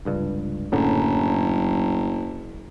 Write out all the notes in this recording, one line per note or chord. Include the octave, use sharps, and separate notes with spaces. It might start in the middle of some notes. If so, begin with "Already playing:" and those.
F1 C#2 G2
F#1 F#2 A2 D3